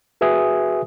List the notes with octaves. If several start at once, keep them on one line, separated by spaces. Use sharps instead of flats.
F#4 G#4 B4 E5 G#5 D#6